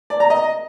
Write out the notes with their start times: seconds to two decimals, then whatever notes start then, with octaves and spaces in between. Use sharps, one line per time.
0.10 D5
0.20 A#5
0.30 D#5